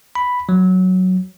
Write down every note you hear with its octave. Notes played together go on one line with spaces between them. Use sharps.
B5
F#3